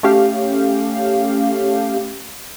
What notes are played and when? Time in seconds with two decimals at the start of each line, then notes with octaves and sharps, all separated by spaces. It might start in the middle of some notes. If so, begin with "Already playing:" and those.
0.03 A3 C#4 G4 F5